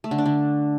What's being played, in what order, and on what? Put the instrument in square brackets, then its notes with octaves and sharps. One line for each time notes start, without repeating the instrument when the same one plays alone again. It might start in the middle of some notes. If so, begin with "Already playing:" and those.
[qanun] A3
D3
D4
D3